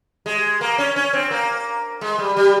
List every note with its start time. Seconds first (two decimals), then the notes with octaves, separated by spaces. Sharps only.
0.26 G#3
0.61 A#3
0.78 C#4
0.96 C#4
1.13 C4
1.31 A#3
2.01 G#3
2.18 G3
2.37 G3